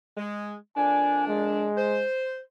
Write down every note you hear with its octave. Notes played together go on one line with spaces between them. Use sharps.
G#3
F2 A#3 D4 G#5
G#3
C5